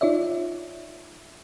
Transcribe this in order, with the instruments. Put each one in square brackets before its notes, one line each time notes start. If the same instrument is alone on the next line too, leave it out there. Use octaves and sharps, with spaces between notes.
[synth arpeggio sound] D#4 F4 C#5 D5 E5